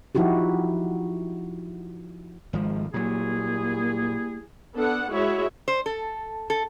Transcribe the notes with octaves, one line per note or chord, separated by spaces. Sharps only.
F3 D#4 E4 F#4 G4
G#1 F3 G#3
A#2 F#3 G3 A#3 E4 G#4
B3 D4 A4 F#5
G#3 E4 F#4 C#5 E5
C5
A4
A4